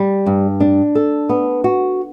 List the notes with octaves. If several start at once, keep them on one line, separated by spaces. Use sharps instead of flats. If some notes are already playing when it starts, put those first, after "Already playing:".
Already playing: G3
G2
D4
A4
B3
F#4